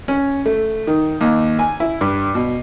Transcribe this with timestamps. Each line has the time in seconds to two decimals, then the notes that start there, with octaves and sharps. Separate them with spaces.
0.08 C#4
0.46 A3
0.87 D#3
1.21 D#2
1.59 G#5
1.80 E4
2.01 G2
2.35 B2